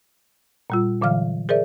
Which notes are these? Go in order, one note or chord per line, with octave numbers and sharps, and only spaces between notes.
A#2 G3 F4
A#2 D3 E3 F#3 F5 F6
G#4 A#4 C5 D5 E5